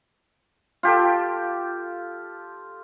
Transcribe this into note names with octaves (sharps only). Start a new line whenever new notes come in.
F4 G4 A4